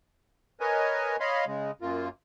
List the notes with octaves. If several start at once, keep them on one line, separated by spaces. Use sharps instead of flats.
A#4 B4 C#5 D#5 G#5
C#5 D#5 F5 B5 C6
C#3 G#3
F#2 A#3 F4